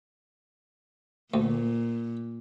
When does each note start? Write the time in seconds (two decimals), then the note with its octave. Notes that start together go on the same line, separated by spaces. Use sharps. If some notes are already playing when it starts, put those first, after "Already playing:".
1.34 D2 A#2